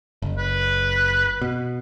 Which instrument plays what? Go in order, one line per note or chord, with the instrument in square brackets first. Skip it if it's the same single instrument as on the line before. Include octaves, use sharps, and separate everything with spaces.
[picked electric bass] F#1
[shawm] B4
[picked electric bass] B2